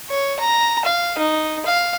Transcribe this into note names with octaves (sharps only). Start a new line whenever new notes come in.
C#5
A#5
F5
D#4
F5